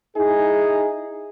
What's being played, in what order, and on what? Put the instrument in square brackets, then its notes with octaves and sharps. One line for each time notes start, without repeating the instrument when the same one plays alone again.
[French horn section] D#4 E4 G#4